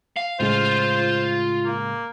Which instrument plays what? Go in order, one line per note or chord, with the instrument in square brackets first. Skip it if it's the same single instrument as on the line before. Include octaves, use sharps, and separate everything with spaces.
[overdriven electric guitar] F5
[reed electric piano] A2 C#3 G#3 [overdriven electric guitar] F4 [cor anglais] C5
[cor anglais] A#3